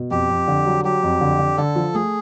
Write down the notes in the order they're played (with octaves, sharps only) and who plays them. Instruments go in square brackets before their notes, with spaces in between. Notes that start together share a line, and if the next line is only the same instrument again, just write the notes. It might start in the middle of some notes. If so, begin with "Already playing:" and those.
Already playing: [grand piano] B2
[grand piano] F2 [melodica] G4
[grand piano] F2
D3
F#3
[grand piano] F#3 [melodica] G4
[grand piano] F2
D3
D3
[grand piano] D3 [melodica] A4
[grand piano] F3
[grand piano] A3 [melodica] G#4